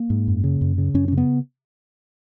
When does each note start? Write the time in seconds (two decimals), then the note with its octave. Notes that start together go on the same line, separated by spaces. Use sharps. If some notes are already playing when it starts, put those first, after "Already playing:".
Already playing: A#3
0.10 G#2
0.28 F#2
0.44 C#3
0.61 F#2
0.78 C#3
0.94 F#2 C#4
1.08 C#3 C#4
1.17 B3